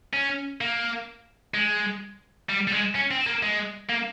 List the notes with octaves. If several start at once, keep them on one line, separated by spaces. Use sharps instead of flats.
C#4
A#3
G#3
G3
G3
G#3
C#4
C4
A#3
G#3
A#3